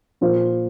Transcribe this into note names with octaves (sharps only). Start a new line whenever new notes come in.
A#2 F3 A#3 F4 C5